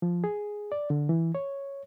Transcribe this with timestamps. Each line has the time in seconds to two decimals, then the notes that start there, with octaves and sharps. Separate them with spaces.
0.02 F3
0.24 G#4
0.72 D5
0.90 D3
1.09 E3
1.35 C#5